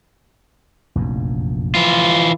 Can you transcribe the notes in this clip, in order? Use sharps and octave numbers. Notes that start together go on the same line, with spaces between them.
F1 A#1 F#2
E3 F3 F4